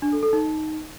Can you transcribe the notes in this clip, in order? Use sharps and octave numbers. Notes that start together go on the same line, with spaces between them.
D4
A4
A4
D#4